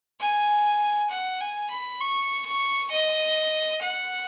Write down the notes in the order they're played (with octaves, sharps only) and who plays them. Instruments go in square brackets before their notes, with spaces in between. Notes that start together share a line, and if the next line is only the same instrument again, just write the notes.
[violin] G#5
F#5
G#5
B5
C#6
C#6
D#5
F#5